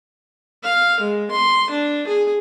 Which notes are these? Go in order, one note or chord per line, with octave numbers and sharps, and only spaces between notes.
F5
G#3
C6
D4
G#4